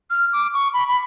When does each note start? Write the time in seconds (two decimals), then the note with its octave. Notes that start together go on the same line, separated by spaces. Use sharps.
0.10 F6
0.32 D6
0.54 C#6
0.73 B5
0.88 B5